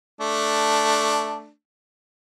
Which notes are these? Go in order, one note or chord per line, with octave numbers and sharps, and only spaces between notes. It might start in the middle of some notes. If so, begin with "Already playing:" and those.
A3 D4